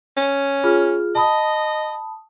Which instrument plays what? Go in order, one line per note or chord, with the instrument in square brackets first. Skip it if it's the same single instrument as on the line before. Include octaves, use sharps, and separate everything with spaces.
[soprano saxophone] C#4
[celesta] F4 G#4 F6
[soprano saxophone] D#5 [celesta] A5 B5 D#6